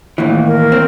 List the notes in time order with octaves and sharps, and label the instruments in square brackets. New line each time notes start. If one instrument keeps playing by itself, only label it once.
[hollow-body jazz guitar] D#2 A2 E3
[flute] A#4
[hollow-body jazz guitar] C4